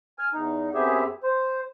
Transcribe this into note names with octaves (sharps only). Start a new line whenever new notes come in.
G#5 F6
E2 D#4
F#2 B3 C4 G4 G#4 E5
C5